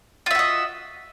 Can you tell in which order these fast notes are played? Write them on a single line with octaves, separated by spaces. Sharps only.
F4 E5 F#4 D#5